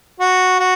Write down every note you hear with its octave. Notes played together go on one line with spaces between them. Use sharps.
F#4
F#4